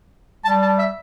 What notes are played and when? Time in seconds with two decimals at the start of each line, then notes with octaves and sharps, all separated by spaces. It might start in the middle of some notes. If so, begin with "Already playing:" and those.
0.45 G3 A5
0.62 A5
0.79 E5